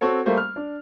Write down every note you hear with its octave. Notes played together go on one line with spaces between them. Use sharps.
C4 F#4 A4 C#5
G3 A3 A#3 C5
F6
D4